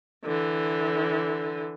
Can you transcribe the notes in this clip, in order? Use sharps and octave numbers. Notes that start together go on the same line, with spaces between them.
D3 E3